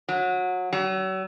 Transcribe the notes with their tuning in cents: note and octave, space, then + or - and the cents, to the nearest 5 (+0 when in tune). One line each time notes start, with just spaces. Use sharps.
F#3 -25
F#3 +40